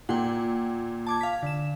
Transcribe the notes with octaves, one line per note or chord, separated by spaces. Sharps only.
A#2 F#5 G5
A5 D6 G#6
F5 B6
D3 E7